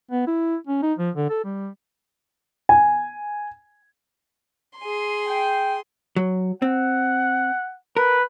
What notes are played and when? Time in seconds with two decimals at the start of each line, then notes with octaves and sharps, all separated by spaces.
0.11 B3
0.27 E4
0.67 C#4
0.83 D#4
0.99 F3
1.15 D3
1.29 A4
1.44 G3
2.69 G#5
4.80 G#4 C6
5.26 G5
6.16 F#3
6.62 C4 F#5
7.97 A#4 B4